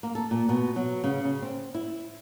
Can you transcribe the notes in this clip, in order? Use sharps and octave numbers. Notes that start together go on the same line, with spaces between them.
A#3
A4
A#2
B2
F#3
C#3
C#3
C4
E4